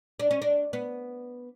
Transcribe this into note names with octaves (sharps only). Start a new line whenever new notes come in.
D4
C#4
D4
B3